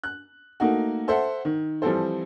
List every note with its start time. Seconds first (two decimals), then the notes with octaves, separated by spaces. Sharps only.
0.04 F#6
0.60 A3 A#3 D#4 F#4
1.08 A4 C5 E5 F#5
1.45 D#3
1.82 E3 F3 G3 C4 A4 C5